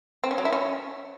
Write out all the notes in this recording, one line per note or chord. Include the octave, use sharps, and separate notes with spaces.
C4
C#4
F#3
E4
C#4